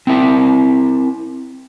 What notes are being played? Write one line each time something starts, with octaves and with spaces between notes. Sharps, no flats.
C4 E4 A#4 E5